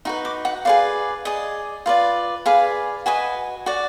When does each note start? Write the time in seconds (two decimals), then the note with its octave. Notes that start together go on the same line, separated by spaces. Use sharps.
0.05 D#4 F#4 B4
0.25 D6
0.45 F#5
0.65 G#4 B4 D5 F5
1.25 G#4 D5 D#5
1.86 F4 B4 D5
2.46 G#4 B4 D5 F5
3.06 F#4 B4 D#5 G#5
3.66 F#4 D5